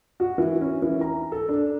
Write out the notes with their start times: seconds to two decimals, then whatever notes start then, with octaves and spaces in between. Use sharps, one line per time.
0.20 F#4
0.38 E3
0.61 C#4
0.82 E3
1.01 A#5
1.32 A4
1.48 D4